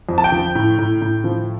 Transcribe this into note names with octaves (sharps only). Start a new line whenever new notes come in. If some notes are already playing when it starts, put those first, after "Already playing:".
F2
A5
G5
F3
A2
A2
A2
F3